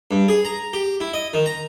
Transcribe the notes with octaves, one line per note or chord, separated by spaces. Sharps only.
G2
G#4
A#5
G4
E4
D#5
D#3
A#5